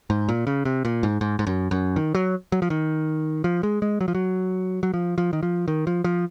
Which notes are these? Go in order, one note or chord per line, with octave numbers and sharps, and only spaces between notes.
G#2
A#2
C#3
C3
A#2
G#2
G#2
G#2
F#2
F#2
D#3
F#3
F#3
F3
D#3
F3
G#3
G#3
F#3
F3
F#3
F#3
F3
F3
D#3
F3
D#3
F3
F3